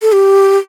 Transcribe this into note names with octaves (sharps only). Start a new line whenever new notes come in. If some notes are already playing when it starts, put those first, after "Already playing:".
A4
G4